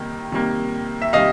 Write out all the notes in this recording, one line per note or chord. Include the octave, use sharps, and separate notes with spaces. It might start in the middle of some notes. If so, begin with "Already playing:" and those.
Already playing: C3 D#3 G3 A#3
C3 D#3 G3 A#3
E5
C3 D#3 G3 D#5 F5